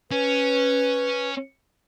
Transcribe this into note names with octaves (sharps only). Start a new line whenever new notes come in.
C#4 B4